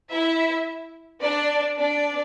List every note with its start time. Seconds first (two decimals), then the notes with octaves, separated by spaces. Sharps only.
0.11 E4 E5
1.22 D4 D5
1.78 D4 D5